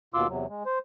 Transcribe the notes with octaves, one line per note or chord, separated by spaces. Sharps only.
D#2 B2 F4 C6 D6 E6
E2 C3 F#3
G#3
C5